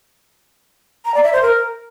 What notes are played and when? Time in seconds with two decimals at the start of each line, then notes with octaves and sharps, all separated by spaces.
1.05 A#5
1.14 D5
1.23 E5
1.33 C5
1.42 A#4